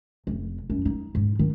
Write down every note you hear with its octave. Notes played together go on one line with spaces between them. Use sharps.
F1
F#2
D#4
G#2
D#3